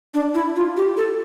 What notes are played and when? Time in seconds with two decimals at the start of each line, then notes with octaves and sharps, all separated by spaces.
0.14 D4
0.34 E4
0.56 F4
0.77 G4
0.97 A4